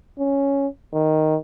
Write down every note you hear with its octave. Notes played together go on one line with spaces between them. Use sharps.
C#4
D#3